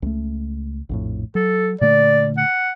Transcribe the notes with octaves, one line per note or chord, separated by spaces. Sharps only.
C#2 A3
A#1 F2 A2
F#3 A4
A#2 D3 A3 D5
F#5